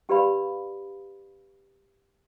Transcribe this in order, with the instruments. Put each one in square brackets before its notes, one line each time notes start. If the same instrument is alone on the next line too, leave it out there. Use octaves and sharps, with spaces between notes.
[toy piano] C#4 G4 B4 D5 F5 B5